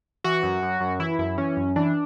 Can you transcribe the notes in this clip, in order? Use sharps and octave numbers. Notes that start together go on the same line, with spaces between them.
E3 F#4
F#2
F#2
F#2
E3 E4
F#2 E4
E3 C#4
F#2
E3 D4